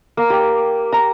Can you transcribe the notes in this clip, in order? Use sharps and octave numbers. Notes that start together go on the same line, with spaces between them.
A#3
G4
A#5